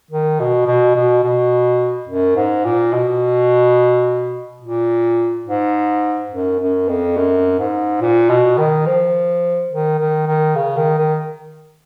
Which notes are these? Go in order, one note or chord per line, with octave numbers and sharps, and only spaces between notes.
D#3
B2
B2
B2
B2
F#2
G#2
A#2
B2
A#2
G#2
F#2
F#2
F2
F#2
G#2
A#2
B2
D#3
F3
D#3
D#3
D#3
C#3
D#3
D#3